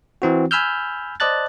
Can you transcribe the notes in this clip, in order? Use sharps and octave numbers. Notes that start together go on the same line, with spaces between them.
E3 C4 F#4
G#5 B5 E6 F6 G6
C5 D5 D#5 A5 F#6 A6